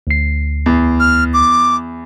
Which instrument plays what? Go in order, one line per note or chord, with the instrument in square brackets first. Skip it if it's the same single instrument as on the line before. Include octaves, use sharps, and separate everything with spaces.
[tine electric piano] D2 C7
[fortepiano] E2
[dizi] F6
D6